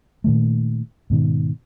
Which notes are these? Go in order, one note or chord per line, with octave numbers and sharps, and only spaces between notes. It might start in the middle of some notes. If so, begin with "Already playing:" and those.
A#2 D#3 A3
G#2 B2 D#3